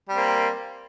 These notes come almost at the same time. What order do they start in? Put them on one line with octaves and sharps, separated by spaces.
G3 C4 A#3